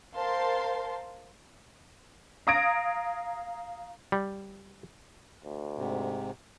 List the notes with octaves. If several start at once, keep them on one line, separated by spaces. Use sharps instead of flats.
A#4 C5 F5 A5 C6
F5 A#5 D#6 G#6 A#6 D7
G3
D2
G#2 C3